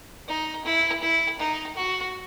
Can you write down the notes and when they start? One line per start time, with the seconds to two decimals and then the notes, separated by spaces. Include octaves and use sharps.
0.28 D#4
0.65 E4
1.02 E4
1.39 D#4
1.76 F#4